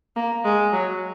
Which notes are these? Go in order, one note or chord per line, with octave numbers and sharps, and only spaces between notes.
A#3
G#3
F#3